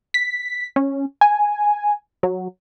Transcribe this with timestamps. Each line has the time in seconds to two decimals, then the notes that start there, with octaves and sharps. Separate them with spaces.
0.14 B6
0.76 C#4
1.21 G#5
2.23 F#3